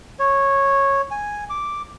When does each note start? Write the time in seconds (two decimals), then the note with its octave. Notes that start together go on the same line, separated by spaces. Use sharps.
0.19 C#5
1.11 G#5
1.50 D6